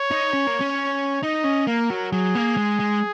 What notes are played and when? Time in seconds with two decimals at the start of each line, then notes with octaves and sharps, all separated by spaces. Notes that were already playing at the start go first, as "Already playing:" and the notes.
Already playing: C#5
0.11 D#4
0.33 C#4
0.47 A#3
0.61 C#4
1.23 D#4 D#5
1.45 C#4
1.67 A#3 A#4
1.90 F#3
2.12 F#3 G#4
2.35 A#3
2.57 G#3
2.80 G#3